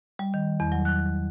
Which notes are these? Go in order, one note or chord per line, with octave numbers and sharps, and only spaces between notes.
G3
D#3
E2
F#3
F#6